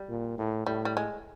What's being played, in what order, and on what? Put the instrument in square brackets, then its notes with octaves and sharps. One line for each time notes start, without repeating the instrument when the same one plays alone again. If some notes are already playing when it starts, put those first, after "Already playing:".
Already playing: [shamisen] G3
[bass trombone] A#2
A2
[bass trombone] A2 [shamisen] G3
[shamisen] G3
G#3